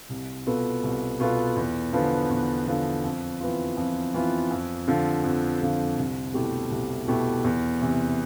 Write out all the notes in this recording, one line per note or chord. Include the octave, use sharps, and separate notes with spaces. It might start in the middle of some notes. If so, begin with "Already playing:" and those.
C2
B2 B3 F4 A4
C2
B2 B3 F4 A4
E2
D3 F3 B3
E2
D3 F3 B3
F2
E3 B3 F4
F2
E3 B3 F4
F2
D3 F3
F2
D3 F3
C2
B2 A3 E4 G4
C2
B2 A3 E4 G4
E2
C3 E3